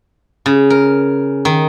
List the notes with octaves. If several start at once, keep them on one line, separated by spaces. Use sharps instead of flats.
C#3
A#4
D#3